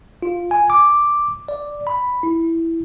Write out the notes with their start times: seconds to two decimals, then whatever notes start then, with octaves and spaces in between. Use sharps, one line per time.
0.23 F4
0.51 G#5
0.70 D6
1.48 D5
1.87 B5
2.23 E4